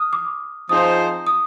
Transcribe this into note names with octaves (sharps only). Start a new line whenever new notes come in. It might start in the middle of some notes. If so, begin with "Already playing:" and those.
Already playing: D#6 F6
D6
F3 C4 D#4 G#4 C5 D#6
D#6